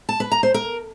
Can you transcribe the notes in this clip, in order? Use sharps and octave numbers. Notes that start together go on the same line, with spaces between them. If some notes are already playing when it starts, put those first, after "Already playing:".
A5
B4
A#5
C5
A#4